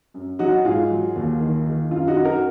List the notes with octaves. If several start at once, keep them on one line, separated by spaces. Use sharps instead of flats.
F#2
F#3 D#4 F#4
G#2 F4 G#4
F#3
D#2
D#3
D#3
F#2 F4
D#4 F#4
F#2
F#4 A#4